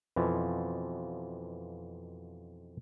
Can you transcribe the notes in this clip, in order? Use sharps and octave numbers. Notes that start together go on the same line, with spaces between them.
F2 B2 E3 F3